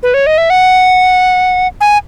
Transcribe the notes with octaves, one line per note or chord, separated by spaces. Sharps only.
B4
C#5
D#5
E5
F#5
G#5